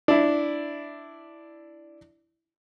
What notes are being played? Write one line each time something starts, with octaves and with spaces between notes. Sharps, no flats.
D4 E4